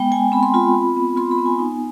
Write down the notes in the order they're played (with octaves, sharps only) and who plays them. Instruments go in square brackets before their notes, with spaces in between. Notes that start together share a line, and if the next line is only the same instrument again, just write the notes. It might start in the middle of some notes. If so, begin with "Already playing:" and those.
Already playing: [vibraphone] G#3 B3 G5
G#3 G#5
C4 B5
C6
F4 B5
F4
B3
F4 C6
B5
B3
G#5
D#4